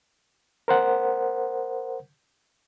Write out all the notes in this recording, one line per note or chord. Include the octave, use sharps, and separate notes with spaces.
A#4 C5 F#5